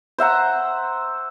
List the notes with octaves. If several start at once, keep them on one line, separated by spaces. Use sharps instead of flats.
C5 E5 F#5 A#5